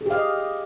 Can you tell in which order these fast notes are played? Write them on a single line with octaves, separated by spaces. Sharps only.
G#4 G4 F5 D#5